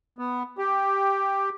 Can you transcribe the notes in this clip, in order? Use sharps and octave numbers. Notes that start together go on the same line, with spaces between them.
B3
G4